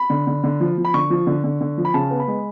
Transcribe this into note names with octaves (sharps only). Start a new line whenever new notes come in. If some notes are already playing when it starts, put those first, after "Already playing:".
Already playing: B5
D3
D3
D3
F3
F3
B5
D3 C#6
F3
D3
D3
D3
F3
B5
C#3 A5
B3
B5
G#3